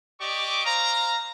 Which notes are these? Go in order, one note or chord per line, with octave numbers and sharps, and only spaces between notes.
G4 D5 D#5 C#6 D6
C5 F5 A#5